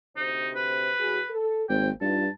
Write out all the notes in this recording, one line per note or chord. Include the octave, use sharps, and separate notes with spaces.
D2 C3 D#4 C5
B4
A2 F#4 G#4
A4
G#1 G3 A#3 C4 G5
G2 E3 D#4 F4 A5